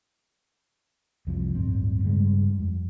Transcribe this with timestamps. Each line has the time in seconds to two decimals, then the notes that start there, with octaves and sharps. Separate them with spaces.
1.27 C2 F2 C3 F3
1.54 D1 G1 C4
2.04 G2 C#3 G3 G#3
2.59 F2